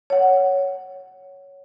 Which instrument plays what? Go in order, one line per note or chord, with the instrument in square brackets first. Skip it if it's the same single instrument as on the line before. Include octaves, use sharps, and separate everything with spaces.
[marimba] C#5 F#5